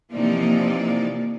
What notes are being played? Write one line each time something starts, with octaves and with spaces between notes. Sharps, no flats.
C3 E3 F3 A#3 D#4 D5